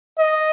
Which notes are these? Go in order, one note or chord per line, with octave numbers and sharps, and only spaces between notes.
D#5